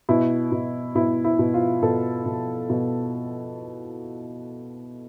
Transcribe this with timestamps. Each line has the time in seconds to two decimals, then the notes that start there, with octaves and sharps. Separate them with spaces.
0.09 B2 E4
0.52 B2
0.96 B2 E4
1.24 E4
1.39 B2
1.54 F4
1.83 B2 A4
2.26 B2
2.70 B2